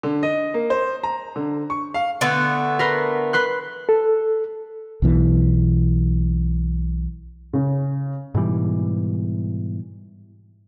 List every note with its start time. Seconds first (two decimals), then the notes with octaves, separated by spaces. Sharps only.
0.03 D3
0.23 D#5
0.54 A#3
0.70 C5
1.03 A#5
1.36 D3
1.70 C#6
1.94 F5
2.21 D3 A3 B3
2.79 A#4 B4 C6
3.33 B4 C6 F#6
3.89 A4
5.02 B1 B2 E3
7.53 C#3
8.35 G#2 B2 E3 G3